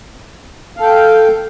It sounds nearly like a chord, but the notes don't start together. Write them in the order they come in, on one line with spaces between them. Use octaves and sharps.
F5 A4 G5